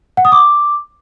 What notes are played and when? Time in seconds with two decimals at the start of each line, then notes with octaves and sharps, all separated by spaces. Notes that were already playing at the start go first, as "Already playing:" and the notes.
0.17 F#5
0.25 D#6
0.32 D6